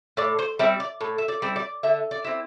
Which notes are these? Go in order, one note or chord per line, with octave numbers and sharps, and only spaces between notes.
A2 D5
C5
G3 C4 E4 E5
D5
A2
E5
D5
G3 C4 E4
D5
D3 E5
D5
C4 E4